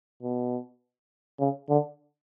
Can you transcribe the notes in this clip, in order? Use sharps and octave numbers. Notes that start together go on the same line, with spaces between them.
B2
C#3
D3